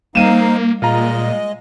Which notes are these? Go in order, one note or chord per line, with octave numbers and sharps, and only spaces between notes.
G3 A#3 C4 D#4 E4 F5 D#7 E7
A#2 G#3 F4 D#5 A#5